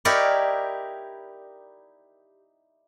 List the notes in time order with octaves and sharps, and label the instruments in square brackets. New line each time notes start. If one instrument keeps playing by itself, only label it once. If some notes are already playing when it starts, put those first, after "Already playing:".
[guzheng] D#4 E4 G4 A#4 C#5 D5